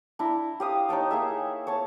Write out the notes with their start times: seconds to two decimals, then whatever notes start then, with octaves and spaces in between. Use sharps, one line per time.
0.19 D4 E4 A#5
0.60 G4 F5 D#6
0.89 D#4 C#5 G5 A5
1.11 A#3 G#4 E5
1.67 C#5 A5